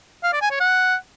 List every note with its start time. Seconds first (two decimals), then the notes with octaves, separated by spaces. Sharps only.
0.24 F5
0.33 D5
0.42 G#5
0.51 C#5
0.60 F#5